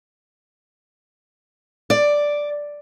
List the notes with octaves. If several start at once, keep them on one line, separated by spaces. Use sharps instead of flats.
D5